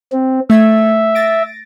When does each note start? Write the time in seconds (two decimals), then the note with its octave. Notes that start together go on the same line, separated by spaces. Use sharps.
0.12 C4
0.50 A3 E5 E6 G#6
1.15 A6 A#6 D7